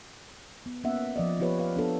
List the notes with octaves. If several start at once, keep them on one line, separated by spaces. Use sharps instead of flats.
B3
A#3 B3 C#4 E5 F#5
F3 D5 D#5
F3 B3 F4 G4 B4 C#5
B4 F5
B3 D4 A4